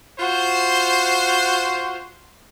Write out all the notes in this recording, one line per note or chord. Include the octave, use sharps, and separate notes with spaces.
F4 F#4 C5